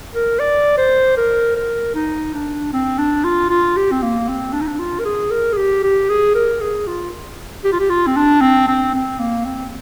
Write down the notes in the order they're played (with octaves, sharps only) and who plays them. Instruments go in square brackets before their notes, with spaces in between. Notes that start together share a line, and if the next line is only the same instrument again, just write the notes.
[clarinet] A#4
D5
C5
A#4
A#4
D#4
D4
C4
D4
F4
F4
G4
C4
A#3
C4
D4
D#4
D4
F4
A#4
G#4
A#4
G#4
G4
G4
G#4
A#4
G#4
F4
G4
F4
G4
F4
C4
D4
C4
C4
C4
A#3
C4